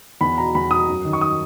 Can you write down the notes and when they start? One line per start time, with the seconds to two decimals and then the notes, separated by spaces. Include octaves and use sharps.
0.21 E2 B5
0.38 B2 A#5
0.55 E2 B5
0.71 B2 D#6
0.88 F#2
1.05 D#3
1.13 C#6
1.21 D#6